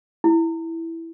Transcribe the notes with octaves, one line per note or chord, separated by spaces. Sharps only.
E4